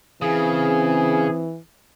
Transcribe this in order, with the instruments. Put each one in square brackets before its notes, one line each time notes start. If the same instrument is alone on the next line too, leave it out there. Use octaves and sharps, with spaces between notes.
[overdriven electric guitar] C#3 [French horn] E3 [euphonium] C4 [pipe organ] G#4